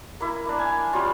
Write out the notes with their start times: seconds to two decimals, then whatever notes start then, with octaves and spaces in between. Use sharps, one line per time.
0.20 A#3 E4
0.45 A#3 D4
0.59 G#5
0.93 G3 C#4 F4